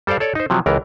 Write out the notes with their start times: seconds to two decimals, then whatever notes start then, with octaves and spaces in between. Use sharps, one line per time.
0.07 G3 A4 C5 D5 F5
0.20 A4 C#5 D5
0.35 D#4 C5
0.50 C3 F3 F#3
0.66 C#2 E3 A#4